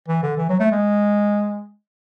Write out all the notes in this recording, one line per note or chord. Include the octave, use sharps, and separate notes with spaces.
E3
D3
E3
F#3
A3
G#3